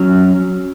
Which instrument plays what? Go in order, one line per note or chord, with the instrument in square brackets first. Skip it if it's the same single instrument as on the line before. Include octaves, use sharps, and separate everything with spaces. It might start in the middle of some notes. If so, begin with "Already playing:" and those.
Already playing: [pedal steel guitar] F#3 C#4